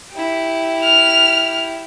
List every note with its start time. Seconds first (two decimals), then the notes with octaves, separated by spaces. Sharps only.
0.13 E4 G4
0.83 F6